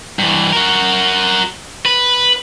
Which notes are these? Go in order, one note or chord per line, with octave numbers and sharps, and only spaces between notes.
G2 E3
F#4 A#4
B4